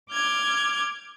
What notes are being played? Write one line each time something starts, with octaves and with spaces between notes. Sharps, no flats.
D6 F6 G6 G#6